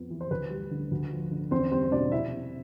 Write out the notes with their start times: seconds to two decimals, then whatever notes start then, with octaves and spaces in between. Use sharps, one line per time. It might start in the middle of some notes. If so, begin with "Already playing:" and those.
Already playing: F2 B3
0.10 E3
0.21 C5
0.31 D2 B4
0.50 G3
0.71 D3
0.91 D2
1.11 F3
1.31 D3
1.51 E2 C4 C5
1.71 G3 C4 C5
1.83 C5
1.91 B2 D4 D5
2.12 C3 E4 E5
2.32 C4